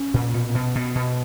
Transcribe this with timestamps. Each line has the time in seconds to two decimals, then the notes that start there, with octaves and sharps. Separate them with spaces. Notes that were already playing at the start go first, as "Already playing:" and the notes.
Already playing: C#4
0.14 A#2
0.34 B2
0.55 B2
0.75 B2
0.95 B2